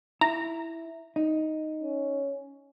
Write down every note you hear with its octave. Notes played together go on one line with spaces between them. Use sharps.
E4 A#5
D#4
C#4